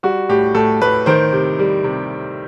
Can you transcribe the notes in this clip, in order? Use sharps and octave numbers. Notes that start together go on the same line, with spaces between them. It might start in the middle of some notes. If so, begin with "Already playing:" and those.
G3 F#4
A2 G4
A2 A4
A2 B4
D#3 C5
C3
G3
C3